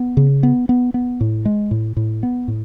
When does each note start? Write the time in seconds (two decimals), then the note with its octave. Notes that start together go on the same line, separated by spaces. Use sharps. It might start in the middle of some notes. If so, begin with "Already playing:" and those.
Already playing: B3
0.17 C#3
0.43 B3
0.69 B3
0.94 B3
1.21 A2
1.45 G#3
1.71 A2
1.97 A2
2.23 B3
2.48 A2